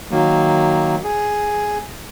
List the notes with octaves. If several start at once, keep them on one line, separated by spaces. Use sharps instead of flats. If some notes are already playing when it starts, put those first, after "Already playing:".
D#3 F#3 A#3
G#4